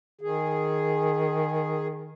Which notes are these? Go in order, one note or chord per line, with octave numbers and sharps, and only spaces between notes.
D#3 G#4